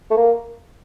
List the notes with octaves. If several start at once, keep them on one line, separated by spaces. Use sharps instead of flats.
A3
A#3